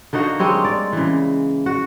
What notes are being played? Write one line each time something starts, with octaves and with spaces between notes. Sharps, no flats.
D3 A#3 D#4 F#4
G3 G#3 C4 C#5
D5
C#3 E3
F#4